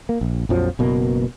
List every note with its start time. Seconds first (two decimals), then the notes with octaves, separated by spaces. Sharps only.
0.09 A#3
0.21 A#1
0.49 A#1 F2 F3 F#3
0.79 F#1 B2 A#3